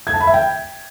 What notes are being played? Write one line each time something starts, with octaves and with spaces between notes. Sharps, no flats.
G#6
A5
B5
E5
G5